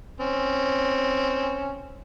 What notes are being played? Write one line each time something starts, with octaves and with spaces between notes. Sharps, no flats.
C4 C#4